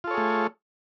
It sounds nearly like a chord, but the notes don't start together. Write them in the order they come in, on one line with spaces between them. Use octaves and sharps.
F4 A4 C#5 G#4 A3